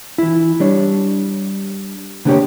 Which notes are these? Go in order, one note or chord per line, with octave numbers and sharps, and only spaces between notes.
E3 E4
G3 D4 C#5
D3 A#3 B3 D4 G4 C#5